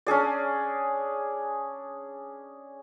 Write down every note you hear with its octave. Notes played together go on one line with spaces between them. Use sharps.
C#4 D4 G#4 D5